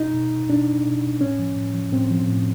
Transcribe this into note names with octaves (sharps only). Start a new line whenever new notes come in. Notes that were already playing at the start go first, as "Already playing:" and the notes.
Already playing: B2 D#4
B2
B2 D4
B2
A2 C#4
F3
A2
F3
A2 C4
F3
A2